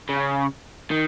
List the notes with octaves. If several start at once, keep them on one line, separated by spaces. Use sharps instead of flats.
C#3
D#3